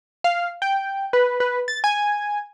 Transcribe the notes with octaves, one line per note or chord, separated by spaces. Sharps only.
F5
G5
B4
B4
A6
G#5